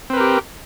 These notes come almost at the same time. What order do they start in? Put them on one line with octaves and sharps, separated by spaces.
C4 B4 A#4 G4